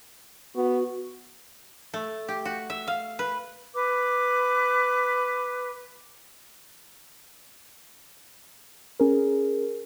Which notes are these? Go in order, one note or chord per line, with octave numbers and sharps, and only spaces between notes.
B3 F#4
A3
G4
F#4
E5
F5
B4
B4 D6
C#4 G#4 A#4